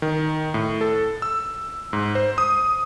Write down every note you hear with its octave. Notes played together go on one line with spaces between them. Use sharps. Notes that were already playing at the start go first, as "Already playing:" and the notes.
D#3
A2
A4
E6
G#2
C5
D#6